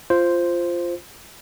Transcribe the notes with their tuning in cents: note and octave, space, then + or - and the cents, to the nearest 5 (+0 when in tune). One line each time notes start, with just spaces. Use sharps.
F4 -10 C5 +0